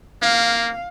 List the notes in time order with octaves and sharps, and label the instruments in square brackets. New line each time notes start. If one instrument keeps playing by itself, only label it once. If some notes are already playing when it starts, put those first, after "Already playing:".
[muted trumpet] A#3 [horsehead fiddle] F5